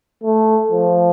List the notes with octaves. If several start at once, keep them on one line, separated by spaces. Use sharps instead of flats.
A3
F3